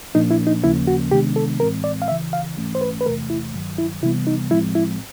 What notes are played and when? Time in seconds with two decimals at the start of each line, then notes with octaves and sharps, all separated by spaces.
0.14 A#2 F3 A#3 D4 D#4
0.31 E4
0.47 D#4
0.63 D#2 C#3 F3 A#3 C#4 E4
0.87 F#4
1.11 C3 D#3 G#3 B3 D4 G4
1.36 A4
1.60 A2 E3 G#3 C4 A#4
1.84 D5
2.02 F5
2.08 C#2 C#3 E3 E5
2.33 F5
2.57 G#2 E3 A3 C#4
2.75 C5
2.81 B4
3.01 B4
3.05 E2 C3 E3 A3 A#4
3.30 E4
3.54 G2 D#3 F#3
3.78 E4
4.02 C3 E3 G3 B3 E4
4.27 D#4
4.51 A2 F3 G#3 C4 E4
4.75 E4